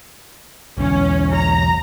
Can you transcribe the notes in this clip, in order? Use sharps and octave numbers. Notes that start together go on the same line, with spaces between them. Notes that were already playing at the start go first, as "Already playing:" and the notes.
B1 E2 C#4
A#5